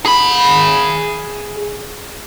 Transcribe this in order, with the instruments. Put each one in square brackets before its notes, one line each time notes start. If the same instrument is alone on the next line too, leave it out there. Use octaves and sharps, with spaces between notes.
[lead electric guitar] G#4 B5